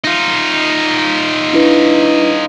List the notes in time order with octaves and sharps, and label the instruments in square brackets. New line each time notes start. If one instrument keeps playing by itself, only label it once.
[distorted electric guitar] D#4 F4
[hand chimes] D4 E4 B4